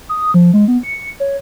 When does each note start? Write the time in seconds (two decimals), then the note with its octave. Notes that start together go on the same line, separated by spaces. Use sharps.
0.09 D#6
0.34 F3
0.54 G#3
0.68 B3
0.83 C#7
1.20 C#5